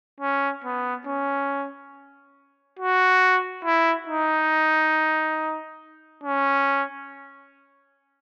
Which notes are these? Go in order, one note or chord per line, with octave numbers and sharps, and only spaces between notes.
C#4
B3
C#4
F#4
E4
D#4
C#4